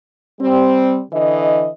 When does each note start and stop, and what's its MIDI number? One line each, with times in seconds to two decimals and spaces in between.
0.40 1.01 55
0.40 1.01 60
1.12 1.68 50
1.12 1.68 52
1.12 1.68 75